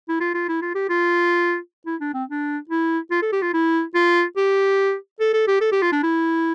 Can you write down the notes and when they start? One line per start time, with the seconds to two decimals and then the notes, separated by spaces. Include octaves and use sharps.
0.09 E4
0.20 F4
0.34 F4
0.48 E4
0.62 F4
0.75 G4
0.89 F4
1.86 E4
2.00 D4
2.14 C4
2.29 D4
2.69 E4
3.11 F4
3.22 A4
3.33 G4
3.42 F4
3.53 E4
3.94 F4
4.37 G4
5.20 A4
5.33 A4
5.47 G4
5.61 A4
5.72 G4
5.82 F4
5.92 D4
6.03 E4